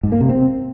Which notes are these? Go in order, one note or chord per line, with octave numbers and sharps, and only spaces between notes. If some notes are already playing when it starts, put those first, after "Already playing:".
G#2
A#3
C3
C4